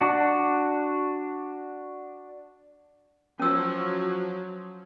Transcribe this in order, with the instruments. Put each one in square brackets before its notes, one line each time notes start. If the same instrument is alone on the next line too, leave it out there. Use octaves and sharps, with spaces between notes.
[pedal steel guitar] D4 F#4
[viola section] F3 F#3 [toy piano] C#4 E6